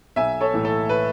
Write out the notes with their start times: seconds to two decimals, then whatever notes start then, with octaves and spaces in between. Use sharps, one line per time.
0.16 B1 E5 G#5
0.41 A4 C#5
0.53 A2 E3
0.65 A4
0.89 B4